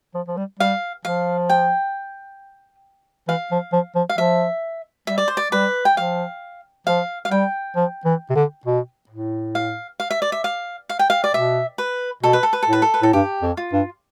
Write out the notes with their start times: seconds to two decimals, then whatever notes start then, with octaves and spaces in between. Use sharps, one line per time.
0.15 F3
0.28 F3
0.37 G3
0.60 G3 F5
1.05 F3 F5
1.49 G5
3.28 E3 F5
3.52 F3
3.73 F3
3.95 F3
4.09 F5
4.18 F3 E5
5.07 G3 E5
5.18 D5
5.28 C5
5.37 D5
5.52 G3 B4
5.85 G5
5.97 F3 F5
6.87 F3 F5
7.25 F5
7.31 G3 G5
7.76 F3
8.06 E3
8.30 C3
8.35 D3
8.66 B2
9.10 A2
9.55 F5
10.00 F5
10.11 E5
10.22 D5
10.32 E5
10.44 F5
10.89 F5
10.99 G5
11.10 F5
11.24 D5
11.34 B2 E5
11.78 B4
12.23 B2 A4
12.33 B4
12.43 A4
12.53 B4
12.63 A4
12.68 A2 B4
12.82 A4
12.94 B4
13.03 A2 A4
13.13 G2 G4
13.42 F2
13.57 F4
13.73 G2